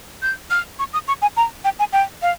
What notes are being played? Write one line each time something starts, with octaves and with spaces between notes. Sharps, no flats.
G6
F6
C#6
D#6
C#6
G#5
A#5
G5
G#5
G5
F5